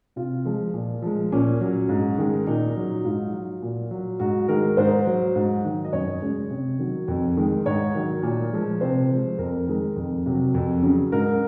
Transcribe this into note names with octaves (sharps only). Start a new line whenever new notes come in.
C3 F4
F3 G#3
A#2
F3 G#3
A#2 C#4
F#3
G#2
D#3 G#3
A#2 D#4
F#3
G#2 F4
F#3
A#2
F#3
G#2 F#4
D#3 G#3 A#4
G#2 C5
F#3
G#2
D#3 F#3
D#5
F#2 C#5
C#3 G#3
C3
D#3 F#3
F2
D#3 G#3
G#2 C#5
D#3 F#3
A#2
F3 G#3
C3 C5
F3 G#3
F2 A#4
D#3 G#3
F2
C3 F#3
F2
C#3 F#3
G#2 A#4